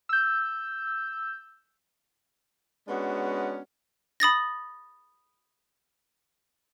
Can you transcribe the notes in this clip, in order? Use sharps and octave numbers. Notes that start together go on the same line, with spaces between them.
E6 G6
G#3 B3 C#4 D4 F#4
B5 D#6 A6 A#6